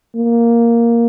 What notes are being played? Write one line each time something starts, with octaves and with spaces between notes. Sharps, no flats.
A#3